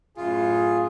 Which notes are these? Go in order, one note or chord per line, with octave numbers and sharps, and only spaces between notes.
F#2 A2 F4 G#4